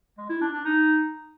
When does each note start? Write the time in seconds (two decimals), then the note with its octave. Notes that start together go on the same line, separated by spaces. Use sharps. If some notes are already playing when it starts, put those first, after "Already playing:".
0.18 G#3
0.29 E4
0.41 D4
0.53 D4
0.65 D#4